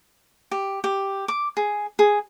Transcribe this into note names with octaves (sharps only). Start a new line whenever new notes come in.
G4
G4
D6
G#4
G#4